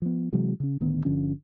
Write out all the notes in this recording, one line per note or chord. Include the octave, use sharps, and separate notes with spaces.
F3 B3
C3 E3 F#3 G#3
C#3 C#4
D1 D2 D#3 B3
G1 D3 F3 C#4